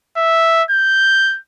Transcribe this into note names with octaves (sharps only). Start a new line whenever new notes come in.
E5
G6